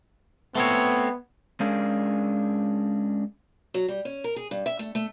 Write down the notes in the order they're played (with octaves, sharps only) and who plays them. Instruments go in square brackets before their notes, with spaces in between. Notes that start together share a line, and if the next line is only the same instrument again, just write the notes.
[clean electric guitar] A3 C4 C#5 [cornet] B3
[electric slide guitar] G#3 C#4 D4 G#4 A#4 F5
[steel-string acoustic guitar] F#3
G3
C#4
A#4
G#4
G2
E5
A3
A3